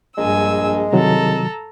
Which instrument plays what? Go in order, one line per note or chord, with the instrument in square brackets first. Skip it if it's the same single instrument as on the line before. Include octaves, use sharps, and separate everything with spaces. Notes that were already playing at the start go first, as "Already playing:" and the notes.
[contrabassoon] A#1 [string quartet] G2 G#5 E6 [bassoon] G#3
[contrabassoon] C2 [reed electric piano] C3 D#3 F#3 [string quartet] A4 A#5